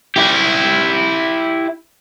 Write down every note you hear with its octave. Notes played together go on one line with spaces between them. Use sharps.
E4 G4